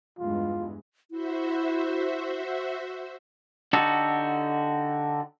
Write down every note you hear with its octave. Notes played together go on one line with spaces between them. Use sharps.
E2 G2 G#3 F4
E4 F#4 C5 E5
D3 D#4 F#4 G4 A4